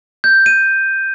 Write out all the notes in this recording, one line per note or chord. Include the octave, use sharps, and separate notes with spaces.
G6
D#7